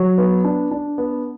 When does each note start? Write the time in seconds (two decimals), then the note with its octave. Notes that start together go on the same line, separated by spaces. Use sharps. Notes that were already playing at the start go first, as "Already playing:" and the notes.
Already playing: F#3
0.18 B3
0.44 D4
0.71 D4
0.98 B3